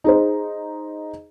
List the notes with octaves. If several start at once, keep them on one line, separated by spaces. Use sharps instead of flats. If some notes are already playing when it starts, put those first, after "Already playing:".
D#4 G#4 C5